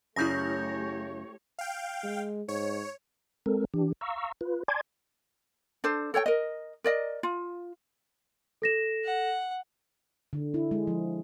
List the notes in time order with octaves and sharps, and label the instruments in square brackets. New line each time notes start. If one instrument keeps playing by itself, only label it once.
[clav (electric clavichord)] F#2 C#3 [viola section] A3 G4 C#5 [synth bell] E4 G6 A#6
[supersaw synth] F5 G5
[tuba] G#3
[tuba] G#2 [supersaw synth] C#5
[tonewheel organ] G#3 C4 A4 A#4
E3 D4 G4
F5 A#5 C#6 E6
F4 B4
D5 G#5 A5 C6 D6 G#6
[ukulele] D4 A4 C5
A4 C#5 F#5 G5
A#4 D#5
A#4 D5 D#5
F4
[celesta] A4 A#6 E7
[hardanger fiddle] F#5
[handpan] D3
E4
G#3
F3